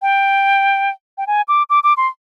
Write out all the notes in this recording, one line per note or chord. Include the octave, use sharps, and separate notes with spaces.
G5
G5
G#5
D6
D6
D6
C6